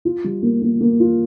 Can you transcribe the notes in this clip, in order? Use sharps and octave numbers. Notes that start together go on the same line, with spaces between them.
F4
G3
A#3
A#3
A#3
F4